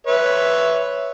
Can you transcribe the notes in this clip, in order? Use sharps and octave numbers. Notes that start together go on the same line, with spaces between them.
B4 C#5 E5